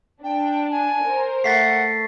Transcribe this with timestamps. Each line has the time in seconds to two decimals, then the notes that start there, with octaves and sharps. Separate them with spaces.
0.24 D4 G5
0.71 G#5
1.04 A#4 C5
1.44 A3 F#5 A6 B6 C7